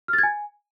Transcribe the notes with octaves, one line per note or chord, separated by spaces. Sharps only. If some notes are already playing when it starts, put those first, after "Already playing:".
F6
A6
G#6
G#5